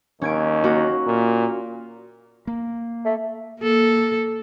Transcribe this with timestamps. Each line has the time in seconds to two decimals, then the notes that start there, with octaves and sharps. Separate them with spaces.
0.22 D#2 C#4 G#6 D7
0.64 A#3 F#4
1.07 A#2
2.47 A#3
3.05 A3
3.60 A#3 A4